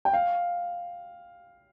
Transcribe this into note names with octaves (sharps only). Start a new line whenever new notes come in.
G5
F5